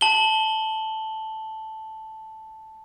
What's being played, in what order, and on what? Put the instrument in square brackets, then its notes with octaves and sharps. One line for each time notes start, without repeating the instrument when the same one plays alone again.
[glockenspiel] A5 F#7 G7